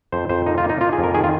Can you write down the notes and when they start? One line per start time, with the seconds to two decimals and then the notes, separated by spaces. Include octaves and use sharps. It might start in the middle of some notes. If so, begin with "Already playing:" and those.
0.12 F2 C5
0.29 F2 C5
0.46 A#3 D#4
0.58 F4
0.64 A#3
0.70 D#4
0.81 A#3 F4
0.93 G#4
0.98 F2
1.03 A#4
1.14 D#3 G#4
1.24 F4